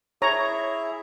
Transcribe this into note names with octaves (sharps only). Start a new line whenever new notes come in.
E4 G#4 C#5 E5 A#5